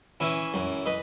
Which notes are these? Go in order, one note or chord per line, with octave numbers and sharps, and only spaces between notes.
E3 C#4 E4
F#2
B4 D#5